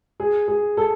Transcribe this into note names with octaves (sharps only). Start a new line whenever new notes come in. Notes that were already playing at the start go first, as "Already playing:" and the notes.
G#4
G#4
A4